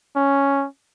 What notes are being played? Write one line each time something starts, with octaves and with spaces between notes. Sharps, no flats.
C#4